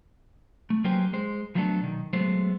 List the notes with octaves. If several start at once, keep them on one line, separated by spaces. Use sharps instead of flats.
A3
F#3 A#3 C#4 G4 B4 C5
G#3 C5
F3 F#3 A3 B3 D4 A4
B1 D#3
F#3 G#3 A3 B3 C5